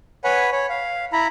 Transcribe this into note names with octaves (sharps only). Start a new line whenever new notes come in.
B4 C#5 F#5 G#5 B5
C#5 B5
F5
E4 A#5 B5